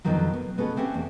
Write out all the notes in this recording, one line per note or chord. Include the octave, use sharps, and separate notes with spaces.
F2 B2 D3 D#3 F3 F#3
B3
B2 B3 C#4 F#4 G#4 A4
A3 C4 C#4 G4 F#5
E2